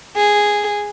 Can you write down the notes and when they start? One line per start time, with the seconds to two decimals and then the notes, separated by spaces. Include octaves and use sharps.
0.16 G#4